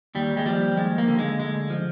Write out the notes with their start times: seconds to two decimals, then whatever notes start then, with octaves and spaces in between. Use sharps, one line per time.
0.15 D#2 G3
0.37 G#3
0.46 F3 G3
0.77 D#2 G#3
0.98 A#3
1.08 D3
1.19 G#3
1.39 D2 G#3
1.70 F3